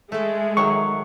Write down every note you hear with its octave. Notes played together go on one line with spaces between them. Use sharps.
G#3 A3 A4 E5
D#3 F#3 C#6